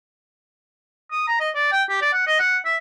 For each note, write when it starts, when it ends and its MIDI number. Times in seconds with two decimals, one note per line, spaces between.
1.11 1.24 87
1.28 1.36 82
1.40 1.49 75
1.55 1.71 74
1.72 1.83 79
1.89 2.00 67
2.01 2.12 74
2.13 2.23 78
2.27 2.35 75
2.39 2.58 78
2.65 2.76 76